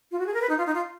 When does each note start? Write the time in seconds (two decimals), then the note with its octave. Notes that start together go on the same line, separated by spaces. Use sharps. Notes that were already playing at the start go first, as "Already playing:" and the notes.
0.12 F4
0.19 F#4
0.26 G#4
0.34 A#4
0.41 B4
0.50 D#4
0.58 F4
0.67 D#4
0.75 F4